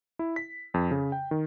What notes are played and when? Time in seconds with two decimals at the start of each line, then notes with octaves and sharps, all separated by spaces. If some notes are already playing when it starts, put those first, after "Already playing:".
0.19 E4
0.36 B6
0.74 F2
0.91 C#3
1.12 G5
1.31 D#3